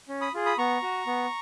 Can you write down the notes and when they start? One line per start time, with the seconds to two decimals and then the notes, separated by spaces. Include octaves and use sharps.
0.09 C#4
0.21 B5 D#6
0.34 F4 G#4
0.46 B5 D#6
0.58 B3 A#5 C#6
0.82 F#4
1.07 B3